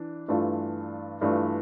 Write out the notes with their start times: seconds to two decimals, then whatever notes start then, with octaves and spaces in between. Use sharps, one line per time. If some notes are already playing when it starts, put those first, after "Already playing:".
Already playing: E3 D4
0.28 G2 E3 A3 D4 F4
1.21 G2 E3 A3 D4 F4